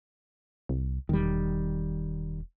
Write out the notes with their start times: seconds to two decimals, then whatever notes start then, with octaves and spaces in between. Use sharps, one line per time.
0.69 C2
1.09 E1 D#3 G3